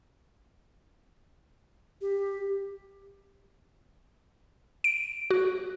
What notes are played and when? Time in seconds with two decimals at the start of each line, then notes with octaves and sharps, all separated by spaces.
2.01 G4
4.84 D7
5.31 F#4